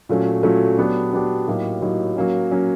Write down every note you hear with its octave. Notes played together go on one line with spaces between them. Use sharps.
A#2 F#3 A3 C#4
A#2 F#3 A3 C#4
F#3 B3 D4 G4
F#3 B3 D4 G4
A2 F#3 A#3 D#4 G4
A2 F#3 A#3 D#4 G4
F#3 A#3 C#4
F#3 A#3 C#4